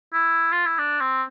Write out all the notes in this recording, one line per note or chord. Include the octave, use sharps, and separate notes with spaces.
E4
F4
E4
D4
C4